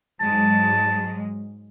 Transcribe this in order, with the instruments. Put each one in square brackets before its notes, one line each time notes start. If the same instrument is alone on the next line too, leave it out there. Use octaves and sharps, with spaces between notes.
[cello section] G#2 F#3 G#3 [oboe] A5